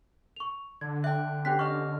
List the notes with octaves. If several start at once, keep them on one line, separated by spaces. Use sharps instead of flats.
C#6 F7
D3 G#6
E5 G5 F#6
B3 C#4 G4 G5 F#6 B6
D#5 C#6 F6